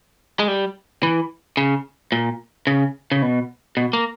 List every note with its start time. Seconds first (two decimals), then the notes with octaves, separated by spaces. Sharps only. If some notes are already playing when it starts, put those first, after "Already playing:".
0.39 G#3
0.48 G3
1.03 E3
1.57 C#3
2.12 A#2
2.67 C#3
3.12 C#3
3.22 B2
3.77 B2
3.93 A#3